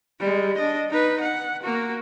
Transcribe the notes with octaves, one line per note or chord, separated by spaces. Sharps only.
G3 G#3
D4 D#5
D#4 B4
F#5
A#3 F#4